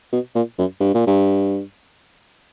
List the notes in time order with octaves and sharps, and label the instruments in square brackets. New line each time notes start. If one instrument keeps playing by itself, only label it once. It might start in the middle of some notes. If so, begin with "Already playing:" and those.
[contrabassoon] B2
A#2
F#2
G2
A#2
G2